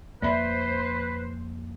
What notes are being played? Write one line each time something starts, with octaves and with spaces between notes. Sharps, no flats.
F2 A#3 B4 C5 D5 E5 B5